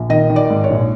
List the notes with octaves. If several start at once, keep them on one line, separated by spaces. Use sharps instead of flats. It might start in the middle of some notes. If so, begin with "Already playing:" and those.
Already playing: A#1
D#3 D#5
D#3
D5
G#2
C#5
A#1